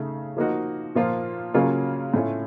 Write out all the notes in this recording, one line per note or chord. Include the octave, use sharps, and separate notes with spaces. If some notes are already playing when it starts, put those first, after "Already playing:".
Already playing: C#3 A3 D#4
F3 A#3 D#4 F#4
A#2 F3 A#3 F4
C#3 F#3 A#3 C#4 F4
A2 A3 C#4 F4